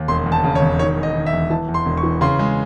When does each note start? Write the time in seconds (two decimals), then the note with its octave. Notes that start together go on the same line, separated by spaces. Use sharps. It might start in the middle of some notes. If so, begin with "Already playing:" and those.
Already playing: D#2
0.08 E1 C6
0.26 E2
0.32 A5
0.44 C#3
0.55 C#5
0.62 E1
0.79 D#3 C#5
0.97 E2
1.03 D#5
1.15 D#3
1.26 E5
1.33 E2
1.50 E3 A5
1.68 E2
1.74 C6
1.86 E1
1.97 C#6
2.03 E3
2.21 C#3 C6
2.39 G#3